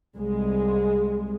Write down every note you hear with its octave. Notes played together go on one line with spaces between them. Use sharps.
C2 G#3